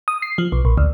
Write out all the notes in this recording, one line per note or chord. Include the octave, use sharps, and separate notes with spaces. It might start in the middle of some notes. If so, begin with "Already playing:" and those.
D#6
C7
F3
B1
A#1
D2